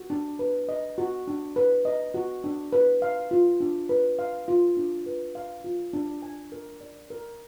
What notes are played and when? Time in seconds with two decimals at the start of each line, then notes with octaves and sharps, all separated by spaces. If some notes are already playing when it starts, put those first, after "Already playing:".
Already playing: F#4
0.10 D4
0.39 B4
0.69 D#5
0.98 F#4
1.28 D4
1.56 B4
1.85 D#5
2.14 F#4
2.44 D4
2.73 B4
3.02 F5
3.31 F4
3.60 D4
3.89 B4
4.19 F5
4.48 F4
4.77 D4
5.06 B4
5.35 F5
5.64 F4
5.93 D4
6.23 G#5
6.52 A#4
6.81 D5
7.10 A#4